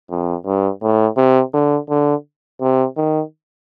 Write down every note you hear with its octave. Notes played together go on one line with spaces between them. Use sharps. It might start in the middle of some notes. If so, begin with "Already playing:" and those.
F2
G2
A2
C3
D3
D3
C3
D#3